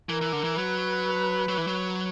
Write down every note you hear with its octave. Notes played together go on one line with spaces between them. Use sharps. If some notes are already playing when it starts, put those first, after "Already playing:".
E3 A#4
E3
D3
E3
F#3 B4
F#3
E3
F#3